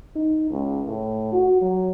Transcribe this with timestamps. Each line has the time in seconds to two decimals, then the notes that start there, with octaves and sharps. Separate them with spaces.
0.16 D#4
0.51 C#2
0.88 A2
1.33 F#4
1.62 F#3